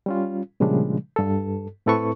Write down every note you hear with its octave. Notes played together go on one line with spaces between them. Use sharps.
G3 C#4 F4
A#2 C#3 F3 G3 G#3 D4
G2 A4
A2 C4 E4 A4 B4 C#6